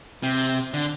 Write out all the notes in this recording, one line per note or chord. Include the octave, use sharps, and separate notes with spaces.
C3
D3